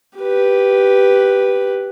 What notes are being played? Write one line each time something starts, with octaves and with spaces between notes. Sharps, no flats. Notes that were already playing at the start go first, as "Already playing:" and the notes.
G4 B4